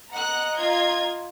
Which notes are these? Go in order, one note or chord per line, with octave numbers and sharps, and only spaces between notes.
D#5 F#5 A#5 F#6
F4 G#6